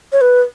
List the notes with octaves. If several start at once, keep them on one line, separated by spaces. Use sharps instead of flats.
C#5
B4